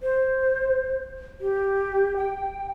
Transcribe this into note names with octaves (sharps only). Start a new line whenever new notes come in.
C5
G4
G5